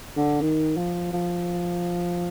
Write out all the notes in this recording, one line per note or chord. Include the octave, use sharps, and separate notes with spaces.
D3
D#3
F3
F3